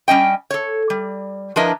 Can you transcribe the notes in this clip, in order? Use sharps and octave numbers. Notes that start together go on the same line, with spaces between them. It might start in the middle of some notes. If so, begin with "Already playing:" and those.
G3 C#4 D#5 G5
A4 C#5
G3
F3 D4 E4 A#4 B4 D#5